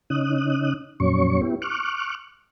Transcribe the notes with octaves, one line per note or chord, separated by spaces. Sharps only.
C#3 C#4 D#4 D#6 F#6
F2 A#2 F#3 C#4 C#5 C#6
B3 E4 G4
C#6 D6 F6 F#6